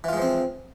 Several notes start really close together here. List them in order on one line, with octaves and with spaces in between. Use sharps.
E3 F4 G#3 F3 C4